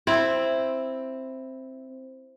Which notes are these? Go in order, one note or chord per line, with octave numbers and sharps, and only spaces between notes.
C4 E4